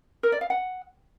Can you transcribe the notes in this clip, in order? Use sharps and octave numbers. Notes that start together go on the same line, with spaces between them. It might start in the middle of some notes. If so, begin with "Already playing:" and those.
A#4
D5
F5
F#5